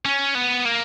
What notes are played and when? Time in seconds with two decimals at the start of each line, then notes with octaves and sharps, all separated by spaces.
0.05 C#4
0.35 B3
0.65 A#3